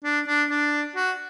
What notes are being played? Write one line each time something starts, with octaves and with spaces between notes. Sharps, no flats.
D4
D4
D4
F#4